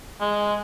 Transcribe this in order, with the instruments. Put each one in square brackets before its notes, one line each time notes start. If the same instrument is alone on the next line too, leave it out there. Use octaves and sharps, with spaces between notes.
[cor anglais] G#3